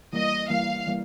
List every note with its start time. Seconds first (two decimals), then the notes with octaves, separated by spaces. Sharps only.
0.13 E3 G3 A#3 D#5
0.50 E3 G3 A#3 F5
0.87 E3 G3 A#3